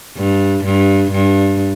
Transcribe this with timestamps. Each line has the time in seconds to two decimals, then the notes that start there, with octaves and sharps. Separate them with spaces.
0.17 G2
0.65 G2
1.12 G2